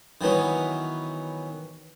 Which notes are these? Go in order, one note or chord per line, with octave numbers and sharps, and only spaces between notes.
D#3 E3 F#3 B3